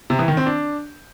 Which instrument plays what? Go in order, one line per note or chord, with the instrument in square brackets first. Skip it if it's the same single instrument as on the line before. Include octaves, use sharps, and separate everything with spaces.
[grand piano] C3
E3
D#3
C4
D4